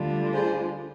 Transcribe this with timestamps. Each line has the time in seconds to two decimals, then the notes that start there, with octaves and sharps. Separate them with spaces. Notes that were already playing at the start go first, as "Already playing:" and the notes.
Already playing: D2 D3 G3 D4 F4
0.33 G#4 C5